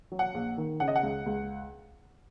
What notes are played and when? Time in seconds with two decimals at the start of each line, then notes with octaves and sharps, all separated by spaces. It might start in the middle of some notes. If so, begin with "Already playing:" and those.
0.12 F#3
0.19 F#5
0.34 A#1
0.58 D#3
0.80 C#3 F#5
0.88 D#5
0.96 F#5
1.03 C#2
1.26 C#2